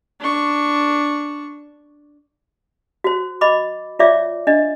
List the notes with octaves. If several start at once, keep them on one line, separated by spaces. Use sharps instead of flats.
D4 C#6
F#4 C5
D#5 B5 D6
F4 C#5 D5 E5 D6
D4 D#5